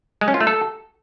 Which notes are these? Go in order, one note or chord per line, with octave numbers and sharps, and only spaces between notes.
G#3
C#4
F4
A3
A4